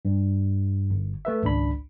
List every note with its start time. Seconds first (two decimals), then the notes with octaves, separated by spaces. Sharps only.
0.05 G2
0.90 G1
1.25 A3 B4 E5
1.43 G#1 C#2 D4 B5